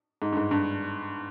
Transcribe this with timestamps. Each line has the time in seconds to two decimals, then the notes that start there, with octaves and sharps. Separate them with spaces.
0.22 G#2
0.32 G2
0.37 G#2
0.51 G2